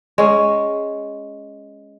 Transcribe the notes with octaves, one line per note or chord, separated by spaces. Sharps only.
G#3 C#4